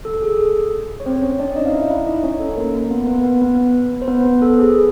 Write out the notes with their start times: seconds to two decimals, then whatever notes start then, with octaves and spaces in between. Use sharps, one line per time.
0.05 A4
0.22 G#4
0.38 A4
1.00 C#5
1.06 C4 C5
1.22 C#4 C#5
1.39 D4 D5
1.56 D#4 D#5
1.66 F5
1.73 E4 E5
1.89 E4 E5
2.07 D#4 D#5
2.23 C#4 C#5
2.40 A4
2.56 A#3 A#4
2.74 A#3 A#4
2.90 B3 B4
3.07 B3 B4
3.24 B3 B4
3.42 B3 B4
4.02 C5
4.08 B3 B4
4.25 B3 B4
4.42 A4
4.59 G#4